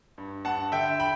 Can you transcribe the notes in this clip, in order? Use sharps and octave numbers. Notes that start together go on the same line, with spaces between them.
G2
G2 F#5 A5
D3 E5 G5
G5 B5